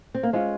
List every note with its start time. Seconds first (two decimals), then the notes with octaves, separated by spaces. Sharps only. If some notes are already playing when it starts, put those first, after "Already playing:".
0.15 C4
0.23 A#3
0.33 G#3 C#4 F4 C5